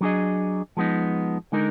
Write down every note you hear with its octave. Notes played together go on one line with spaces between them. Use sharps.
F#3 D4 G#4 D#5
F3 G#3 B3 D#4
D3 G#3 D#4 A#4